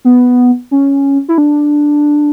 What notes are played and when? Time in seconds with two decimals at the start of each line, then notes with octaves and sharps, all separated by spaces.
0.05 B3
0.71 C#4
1.29 E4
1.38 D4